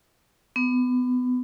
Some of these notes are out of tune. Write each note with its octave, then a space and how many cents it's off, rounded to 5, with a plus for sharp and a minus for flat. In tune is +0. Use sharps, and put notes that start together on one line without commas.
B3 +25